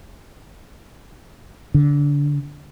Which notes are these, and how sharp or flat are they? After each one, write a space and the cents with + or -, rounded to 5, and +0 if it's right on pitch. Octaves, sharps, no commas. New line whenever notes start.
D3 -25